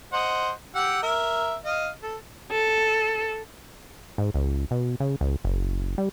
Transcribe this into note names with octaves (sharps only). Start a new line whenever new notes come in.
C5 D#5 F#5
G4 F#5 E6
A#4 E5
D#5 F5
A4
A4
G#2
C#2
B2
C#3
C#2
F#1
G3